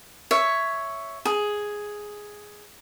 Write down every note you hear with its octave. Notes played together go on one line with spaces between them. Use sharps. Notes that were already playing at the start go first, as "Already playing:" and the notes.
C#5 E5
G#4